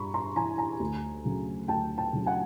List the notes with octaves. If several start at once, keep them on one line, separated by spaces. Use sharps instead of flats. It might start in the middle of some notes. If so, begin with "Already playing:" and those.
Already playing: G2 A#5 B5 C#6
A#5 C6
E3 G#5 A#5
G#5 A#5
D2
C#3 F#3
D2 G5 A5
G5 A5
C#3 F#3
F#5 G#5